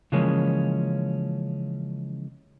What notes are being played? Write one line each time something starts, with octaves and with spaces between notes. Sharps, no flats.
C#3 E3 F3 G#3 A#3 C#4